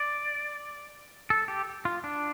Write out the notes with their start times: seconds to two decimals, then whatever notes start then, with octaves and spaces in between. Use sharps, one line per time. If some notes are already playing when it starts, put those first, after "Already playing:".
Already playing: D5
1.30 A4
1.48 G4
1.85 F4
2.04 D4